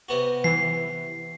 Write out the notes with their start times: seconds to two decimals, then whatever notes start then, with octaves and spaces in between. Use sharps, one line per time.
0.09 C3 B3 F#4
0.44 E3 C7